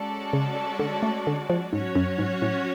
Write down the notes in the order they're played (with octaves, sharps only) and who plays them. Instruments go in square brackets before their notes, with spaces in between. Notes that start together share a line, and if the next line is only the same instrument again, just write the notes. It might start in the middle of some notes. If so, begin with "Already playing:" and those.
Already playing: [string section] G#3 C#4 F#4 A4 D5
[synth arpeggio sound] C#3
D3
A3
D3
F3
[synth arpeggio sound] G#2 [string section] F#3 C#4 F#4 C#5
[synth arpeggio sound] F#2
G#2
A2